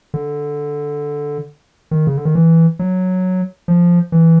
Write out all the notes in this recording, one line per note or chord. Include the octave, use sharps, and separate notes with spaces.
D3
D#3
C#3
D3
D#3
E3
F#3
F3
E3